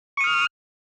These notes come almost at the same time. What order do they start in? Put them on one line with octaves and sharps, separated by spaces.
C#6 D#6 F6